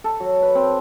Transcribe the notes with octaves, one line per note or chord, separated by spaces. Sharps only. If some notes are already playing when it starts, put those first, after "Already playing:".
A4
F#3
B4
C4